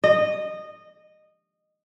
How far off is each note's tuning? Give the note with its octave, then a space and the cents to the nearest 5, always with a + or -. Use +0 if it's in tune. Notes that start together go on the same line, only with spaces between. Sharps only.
D#5 -15